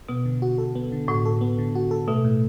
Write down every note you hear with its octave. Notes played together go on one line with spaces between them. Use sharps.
B2 B3
D3
F#4
A4
B3
D3
A2 F#4
A4
B3
D3
F#4
A4
B2 A3
A2